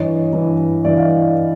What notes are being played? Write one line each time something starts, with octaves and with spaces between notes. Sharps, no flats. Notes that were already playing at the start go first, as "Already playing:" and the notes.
Already playing: G2 E3 C#5 D#5
G2 E3
G2 E3 D5 E5
D#5 F5